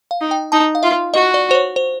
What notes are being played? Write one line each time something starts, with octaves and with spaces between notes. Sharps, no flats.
F5
D#4
G5
D#4 A5
F5
F4 E5
F#4 D#5
D5
C5
C#5
C5